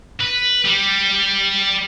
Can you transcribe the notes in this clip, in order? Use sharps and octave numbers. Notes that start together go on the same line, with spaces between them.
B4
G3